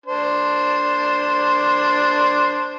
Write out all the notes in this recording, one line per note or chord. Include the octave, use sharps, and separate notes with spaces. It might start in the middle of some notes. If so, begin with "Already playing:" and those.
D4 C5